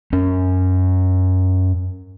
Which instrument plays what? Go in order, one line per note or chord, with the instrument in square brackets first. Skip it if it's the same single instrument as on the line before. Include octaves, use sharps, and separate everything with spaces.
[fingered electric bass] F#2 C#4